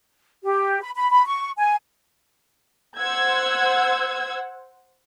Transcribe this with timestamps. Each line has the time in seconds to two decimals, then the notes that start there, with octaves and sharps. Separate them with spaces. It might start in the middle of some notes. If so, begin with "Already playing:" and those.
0.43 G4
0.82 B5
0.96 B5
1.10 B5
1.27 C#6
1.58 G#5
2.99 C5 F#5 E6 G#6